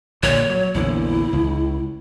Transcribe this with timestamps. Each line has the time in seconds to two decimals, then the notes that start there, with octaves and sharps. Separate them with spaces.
0.23 A#1 A#2 D3 C#5
0.50 F#3
0.75 A#1 E2 D3 E4
1.33 C#2